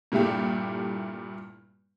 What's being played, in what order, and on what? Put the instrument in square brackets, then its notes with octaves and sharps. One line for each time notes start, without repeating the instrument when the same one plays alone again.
[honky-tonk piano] G2 A#2 G3 A3 E4 G4